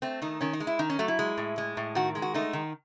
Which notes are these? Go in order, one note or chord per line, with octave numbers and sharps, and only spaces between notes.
A3 C4
D#3 D#4
D#3 C#4
D#4
G#3
E4
D#3 D#4
C#4
F#3 A3
E4
G#3
A2
G#3
A2
D#3 F#4
G#3
F#4
A3 D#4
D#3